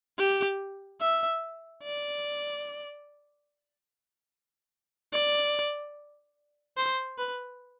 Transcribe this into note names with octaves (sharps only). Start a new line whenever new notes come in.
G4
E5
D5
D5
C5
B4